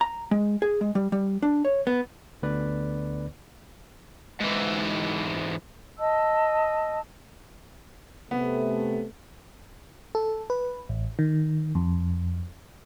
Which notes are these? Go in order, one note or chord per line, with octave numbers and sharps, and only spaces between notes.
A#5
G#3
G#4
G#3
G3
G3
D4
C#5
B3
D2 D3 B3 B4 D5
G#2 E3
D#5 A5 E6
C3 A3 B3
A4
B4
A1
D#3
F2